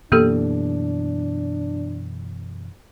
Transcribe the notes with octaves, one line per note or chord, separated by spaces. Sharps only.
F#2 B2 E3 A#3 D4 G4 A4